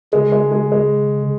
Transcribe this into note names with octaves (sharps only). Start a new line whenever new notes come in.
C#3 G#3
G#3
G#3
G#3